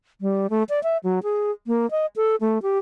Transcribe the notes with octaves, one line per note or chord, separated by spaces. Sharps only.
G3
A3
D5
E5
F#3
G#4
A#3
D#5
A4
A3
G4